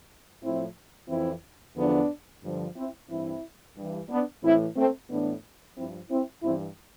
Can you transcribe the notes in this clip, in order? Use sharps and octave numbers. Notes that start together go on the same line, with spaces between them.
A2 F3 C4 E4
F2 E3 C4 E4
E2 D3 F3 B3 D4
G2 D3 F3
C4 E4
G2 E3 C4 E4
G2 E3
B3 D4
A2 E3 C4 E4
A3 C4
A2 E3 B3 D4
G2 F3 C4 E4
C4 E4
G2 E3 C4 E4